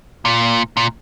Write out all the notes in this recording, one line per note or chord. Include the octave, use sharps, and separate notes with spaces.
A#2
A#2